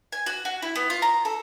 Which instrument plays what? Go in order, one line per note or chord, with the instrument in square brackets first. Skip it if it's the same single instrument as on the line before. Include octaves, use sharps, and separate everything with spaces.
[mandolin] G#5
F#4
F#4
E4
B3
F4
A#5
A4